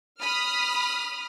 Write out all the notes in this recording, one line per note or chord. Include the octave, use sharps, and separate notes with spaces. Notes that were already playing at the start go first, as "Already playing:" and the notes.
B5 D#6 F6